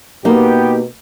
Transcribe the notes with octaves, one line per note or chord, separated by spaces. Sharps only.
B2 A#3 B3 D#4 G4